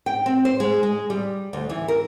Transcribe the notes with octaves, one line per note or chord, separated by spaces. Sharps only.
G5
C4
C5
G#3
G#3
G3
D2
E3
A#4